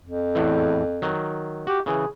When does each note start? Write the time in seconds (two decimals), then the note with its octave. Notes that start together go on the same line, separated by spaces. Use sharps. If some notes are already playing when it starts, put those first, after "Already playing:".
0.04 F2
0.35 E2 A2 E3
1.02 D#3 F#3
1.67 F#4 G4
1.86 C#3 E3 G#4